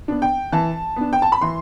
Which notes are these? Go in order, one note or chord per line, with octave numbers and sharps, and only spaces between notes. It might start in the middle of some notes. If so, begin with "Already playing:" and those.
B3 D4
G5
E3 A5
B3 D4
G5
A5
B5
E3 C6